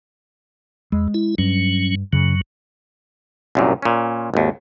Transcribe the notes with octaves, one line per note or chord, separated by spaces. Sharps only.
E2 G#3
E4
G2 F#3 C#4
F#2 C#3 F#3
C2 F#2 A#2
A#2 C#4
G#1 D#2